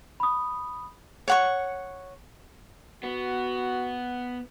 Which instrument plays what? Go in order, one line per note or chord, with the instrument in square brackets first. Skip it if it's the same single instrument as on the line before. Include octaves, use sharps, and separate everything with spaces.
[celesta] B5 D#6
[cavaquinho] C#5 F#5 C#6
[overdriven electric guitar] B3 [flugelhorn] F#4